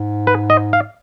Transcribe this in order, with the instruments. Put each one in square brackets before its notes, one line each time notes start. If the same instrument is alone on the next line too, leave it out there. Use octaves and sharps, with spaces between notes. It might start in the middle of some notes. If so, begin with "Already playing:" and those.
Already playing: [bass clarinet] G#2
[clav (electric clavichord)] B4
D#5
F5